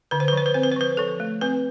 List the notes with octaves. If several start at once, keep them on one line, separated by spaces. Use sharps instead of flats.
D3 B4
C5
B4
F3 C5
B4
C4 C5
B4
C5
F3 B4
F3 A4
A3
C4 B4